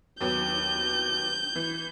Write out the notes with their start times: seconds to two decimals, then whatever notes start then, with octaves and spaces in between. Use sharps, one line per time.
0.21 D#2 F#3 B3 G6
1.56 E3